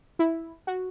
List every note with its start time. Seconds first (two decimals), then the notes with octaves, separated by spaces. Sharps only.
0.19 E4
0.67 F#4